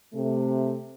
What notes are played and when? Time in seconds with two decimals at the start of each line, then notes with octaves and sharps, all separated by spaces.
0.14 C3 A3